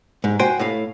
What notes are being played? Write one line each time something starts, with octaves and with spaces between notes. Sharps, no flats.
G#2
F#4 C5 G5 G#5
A2 F5